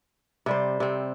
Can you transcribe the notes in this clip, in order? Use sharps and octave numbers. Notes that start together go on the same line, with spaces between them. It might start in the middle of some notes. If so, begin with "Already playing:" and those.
C3 G3 C5
C3 C4